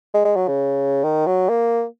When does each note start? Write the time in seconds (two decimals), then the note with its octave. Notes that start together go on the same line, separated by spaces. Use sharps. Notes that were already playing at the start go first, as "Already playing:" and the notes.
0.14 G#3
0.25 G#3
0.36 F#3
0.48 C#3
1.04 D#3
1.26 F#3
1.49 A#3